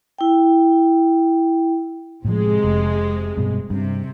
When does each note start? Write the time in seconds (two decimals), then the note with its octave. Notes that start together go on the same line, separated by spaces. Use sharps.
0.19 E4 G5
2.25 A2 C3 F3 G#3
2.64 F1
3.37 G2 B2
3.70 G2 C3